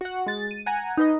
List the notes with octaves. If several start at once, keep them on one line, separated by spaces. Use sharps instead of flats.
F#4 F#5
G#3 A6
D#7
F#5 G#5 A#5
D#4 B4 D#5